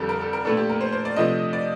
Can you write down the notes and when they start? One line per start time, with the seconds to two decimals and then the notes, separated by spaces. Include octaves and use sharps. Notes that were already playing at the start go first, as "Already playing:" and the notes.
Already playing: F2 D3 G3 G4 A4
0.09 A#4
0.21 A4
0.33 A#4
0.45 A#2 A3 D4 A4
0.57 G4
0.69 A#4
0.81 C5
0.92 C5
1.05 D5
1.16 C3 F3 A3 D4 D#5
1.53 D5